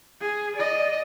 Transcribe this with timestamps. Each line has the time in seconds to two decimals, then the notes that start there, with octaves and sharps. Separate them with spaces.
0.21 G#4
0.56 D5 D#5